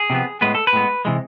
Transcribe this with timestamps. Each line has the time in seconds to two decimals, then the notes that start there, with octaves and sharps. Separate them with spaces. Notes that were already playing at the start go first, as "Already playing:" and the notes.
Already playing: G#4
0.10 C3 F3 B3
0.41 A2 G#3 B3 B4
0.55 A4
0.67 B4
0.73 A2 G#3 B3
1.05 C3 E3 G#3